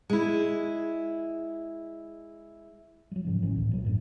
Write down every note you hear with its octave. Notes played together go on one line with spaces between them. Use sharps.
G#3 E4
F#3 G3
G#2 C#3 F3
G1 A2 E3 C#4
C#2 A2
A#2 F#3
G1 F#2 A2